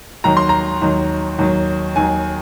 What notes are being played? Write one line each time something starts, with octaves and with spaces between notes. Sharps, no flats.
D#2 D#3 F#3 A#5
C6
A#5
D#2 D#3 F#3
D#2 D#3 F#3
D#2 D#3 F#3 G#5